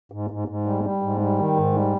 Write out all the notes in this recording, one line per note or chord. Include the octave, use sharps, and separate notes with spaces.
G#2
G#2
G#2
G3
G3
G#2
G3
D#3
G#2
G3